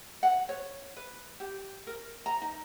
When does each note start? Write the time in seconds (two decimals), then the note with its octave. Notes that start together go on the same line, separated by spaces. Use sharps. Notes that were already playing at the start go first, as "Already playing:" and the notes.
0.23 F#5
0.49 C#5
0.96 B4
1.40 G4
1.87 A#4
2.26 A#5
2.42 D#4